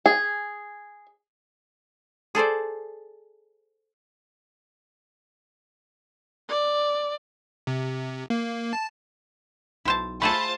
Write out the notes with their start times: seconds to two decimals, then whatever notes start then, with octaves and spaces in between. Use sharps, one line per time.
0.06 G#4
2.35 G#4 A4 C5 D5
6.49 D5
7.67 C3
8.30 A#3
8.73 A5
9.85 B1 E4 C5 A5
10.22 A3 F4 G#4 A4 C5 A5 B5